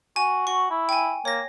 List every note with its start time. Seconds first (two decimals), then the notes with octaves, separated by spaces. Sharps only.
0.16 F#4 G#5
0.47 F#4 C#6
0.71 E4
0.89 G5 G#5
1.25 A#3 C#5 A#6